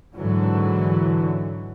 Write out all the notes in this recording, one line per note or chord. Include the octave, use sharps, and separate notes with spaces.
G#2 D3 E3 F#3